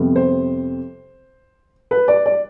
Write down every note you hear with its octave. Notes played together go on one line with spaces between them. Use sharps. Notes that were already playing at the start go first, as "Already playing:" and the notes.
Already playing: F2 C3 G3 B3
C5
B4
D5
D5